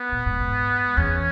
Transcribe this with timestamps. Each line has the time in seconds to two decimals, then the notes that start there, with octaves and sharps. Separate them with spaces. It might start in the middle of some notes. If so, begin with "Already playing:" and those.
Already playing: B3
0.12 A#2
0.26 G#2
0.40 G#2
0.97 E2 C#4